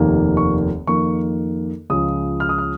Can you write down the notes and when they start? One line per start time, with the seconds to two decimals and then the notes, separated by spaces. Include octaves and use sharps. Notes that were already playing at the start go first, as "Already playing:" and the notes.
Already playing: F1 D#2 D#3 A#3
0.37 C#6
0.87 F2 D#3 A#3 C#6
1.90 C#2 C#3 F3 D#6
2.40 F6
2.49 D#6
2.58 F6